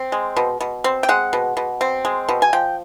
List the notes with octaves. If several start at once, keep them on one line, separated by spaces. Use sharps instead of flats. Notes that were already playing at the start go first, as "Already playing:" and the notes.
Already playing: C4
G#3
B2
B2
C4
G5
G#3 F#5
B2
B2
C4
G#3
B2
G#5
F3 G5